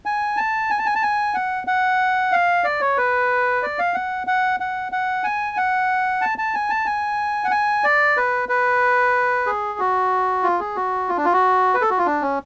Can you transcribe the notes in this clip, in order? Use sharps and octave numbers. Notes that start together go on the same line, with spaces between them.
G#5
A5
G#5
A5
G#5
A5
G#5
F#5
F#5
F5
D5
C#5
B4
D5
F5
F#5
F#5
F#5
F#5
G#5
F#5
A5
A5
G#5
A5
G#5
F#5
G#5
D5
B4
B4
G#4
F#4
F4
G#4
F#4
F4
D4
F4
F#4
B4
A4
F#4
F4
D4
C#4